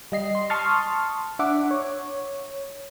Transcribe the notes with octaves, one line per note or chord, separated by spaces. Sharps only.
G3 D#5 C7
C6
A5 C6 C#6 D#6 F6 A6
D4 E5 F#5 D6
C#5